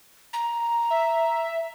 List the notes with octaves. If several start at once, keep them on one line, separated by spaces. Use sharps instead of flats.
A#5
E5